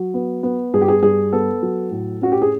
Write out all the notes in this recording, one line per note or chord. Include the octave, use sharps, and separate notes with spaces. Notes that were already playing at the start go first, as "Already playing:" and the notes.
Already playing: F#3
B3
B3
G2 G#4
G4
G#4
G2 G#4
B3 A4
F#3
A2
C#4 F#4
G4
G#4